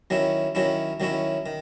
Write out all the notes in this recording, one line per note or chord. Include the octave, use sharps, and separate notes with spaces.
D#3 F#3 C#4 E4
D#3 F#3 C#4 E4
D#3 F#3 C#4 E4
D#3